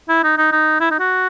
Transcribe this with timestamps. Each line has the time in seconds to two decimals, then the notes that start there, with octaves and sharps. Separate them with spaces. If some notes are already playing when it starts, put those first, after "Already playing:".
0.09 E4
0.24 D#4
0.37 D#4
0.52 D#4
0.80 E4
0.91 D#4
0.99 F#4